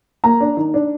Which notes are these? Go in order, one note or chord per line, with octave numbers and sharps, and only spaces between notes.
A#3 A#5
D4
D#3
D4